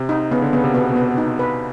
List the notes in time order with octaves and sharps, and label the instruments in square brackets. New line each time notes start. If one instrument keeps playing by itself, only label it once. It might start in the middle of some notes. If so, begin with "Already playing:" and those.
Already playing: [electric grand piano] C3
[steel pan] D#4
[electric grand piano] C#3 [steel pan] B3
[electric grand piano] D3
[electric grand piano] C#3 [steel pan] B3
[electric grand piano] C3
[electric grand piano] B2 [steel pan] B3
[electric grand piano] B2 [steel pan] B3
[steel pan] D#4
B4